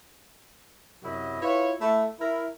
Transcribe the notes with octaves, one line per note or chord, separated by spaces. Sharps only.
F#2 C3 F#3 E4 F#4 D#5
E4 F4 B4 C#5
A3 E4
E4 A#4